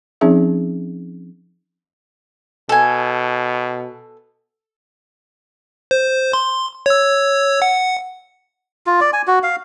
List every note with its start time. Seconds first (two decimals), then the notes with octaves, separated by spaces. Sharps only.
0.21 F3 C4 C#4 D#4 G#4 E5
2.69 B2 A4 G#5
5.91 C5
6.33 C6
6.86 C#5 E6
7.62 F#5
8.86 F4
9.01 D5
9.13 G#5
9.27 F#4
9.43 F5